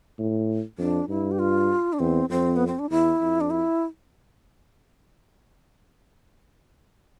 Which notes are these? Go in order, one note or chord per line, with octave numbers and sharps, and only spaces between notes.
A2
F2 D4
G2 E4
G4
F4
D4
E2 C4
F2 C4
B3
C4
D4
E2 E4
F2
D4
E4